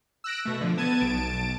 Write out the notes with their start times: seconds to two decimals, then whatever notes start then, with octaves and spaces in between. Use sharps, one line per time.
0.24 E6 F#6 A#6 D7
0.45 B2 A3
0.61 D3 F3
0.77 B3 A5 G#6 D#7
1.01 B1 A5 D7